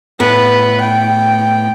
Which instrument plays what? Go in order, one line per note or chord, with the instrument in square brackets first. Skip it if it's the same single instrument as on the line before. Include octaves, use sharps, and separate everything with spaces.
[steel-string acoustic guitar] A2 B3 [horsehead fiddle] B4
[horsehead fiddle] G5